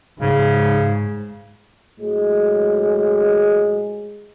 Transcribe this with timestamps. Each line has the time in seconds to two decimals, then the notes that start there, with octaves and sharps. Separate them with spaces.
0.21 G#2 C#3
1.99 A2 F#3 G#3